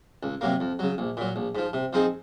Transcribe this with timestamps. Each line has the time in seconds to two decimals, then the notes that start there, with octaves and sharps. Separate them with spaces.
0.23 C#2
0.41 C3 F#3 A#3
0.60 F2
0.79 C#3 F#3
0.98 A#1
1.17 A#2 F#3
1.36 A#1
1.55 G#2 F3
1.73 C3
1.93 F3 C4 D#4 G#4